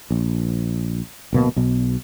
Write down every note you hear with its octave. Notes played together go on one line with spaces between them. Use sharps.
A#1
D1 B2 A#3
B1 B2